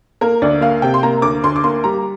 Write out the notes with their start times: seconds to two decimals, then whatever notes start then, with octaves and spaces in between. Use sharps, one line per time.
0.21 A#3 A#4
0.42 D2 D5
0.61 A#3 F5
0.82 C3 G5
0.94 C6
1.03 A#3 A#5
1.22 D2 D6
1.44 D2 C6
1.56 D6
1.64 A#3 C6
1.84 G3 A#5